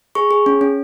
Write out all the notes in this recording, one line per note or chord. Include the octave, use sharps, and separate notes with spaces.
G#4 C#6
G#4
C#4
C#4